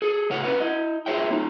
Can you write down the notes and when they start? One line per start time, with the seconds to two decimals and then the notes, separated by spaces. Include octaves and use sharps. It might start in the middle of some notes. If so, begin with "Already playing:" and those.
0.02 G#4 A4
0.30 A2 C#3 C#5 F#5
0.44 C#4 D4 A#4 B4 F#5
0.60 E4 D#5
1.06 F4 G#4 C5 C#5 E5 G5
1.30 A#3 D#4 F4